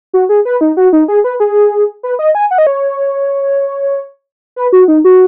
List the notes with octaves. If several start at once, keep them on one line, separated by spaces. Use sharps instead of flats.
F#4
G#4
B4
D#4
F#4
D#4
G#4
B4
G#4
B4
D#5
G#5
F#5
D#5
C#5
B4
F#4
D#4
F#4